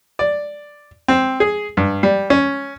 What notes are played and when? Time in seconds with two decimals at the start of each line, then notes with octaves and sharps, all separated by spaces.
0.19 D5
1.08 C4
1.40 G#4
1.77 G2
2.03 G3
2.30 C#4